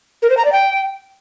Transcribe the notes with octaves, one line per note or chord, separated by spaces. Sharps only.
A#4
C5
A#5
D5
G5